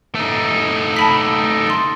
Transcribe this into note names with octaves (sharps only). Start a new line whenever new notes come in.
A3 D#4
A5 B5 B6
C6 A6